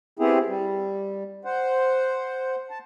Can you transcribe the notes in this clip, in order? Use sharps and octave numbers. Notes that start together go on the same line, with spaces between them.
B3 C4 E4 G4 G#4
G3
C5 F#5
A5